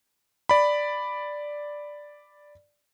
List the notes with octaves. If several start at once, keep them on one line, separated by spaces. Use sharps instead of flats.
D5 B5